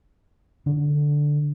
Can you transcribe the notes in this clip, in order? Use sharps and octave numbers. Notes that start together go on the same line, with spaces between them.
D3 D4